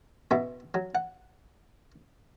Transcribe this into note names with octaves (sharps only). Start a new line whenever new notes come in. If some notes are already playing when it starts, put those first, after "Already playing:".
B2 B3 E4
F#3
F#5